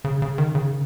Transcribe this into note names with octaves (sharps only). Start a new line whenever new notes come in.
C#3
C#3
D#3
C#3